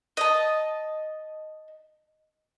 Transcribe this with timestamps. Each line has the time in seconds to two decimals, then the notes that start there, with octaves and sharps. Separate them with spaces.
0.17 D#5 A5